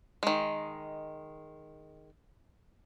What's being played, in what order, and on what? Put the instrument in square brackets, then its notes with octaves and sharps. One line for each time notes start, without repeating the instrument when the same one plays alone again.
[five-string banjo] D#3 G#3